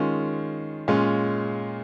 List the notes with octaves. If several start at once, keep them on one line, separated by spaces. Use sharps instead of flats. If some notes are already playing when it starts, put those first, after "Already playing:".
Already playing: D#3 G#3 C#4 F4
A#2 G#3 C#4 F4